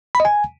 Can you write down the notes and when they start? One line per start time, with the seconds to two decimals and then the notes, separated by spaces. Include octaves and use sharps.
0.15 B5
0.20 D#5
0.25 G#5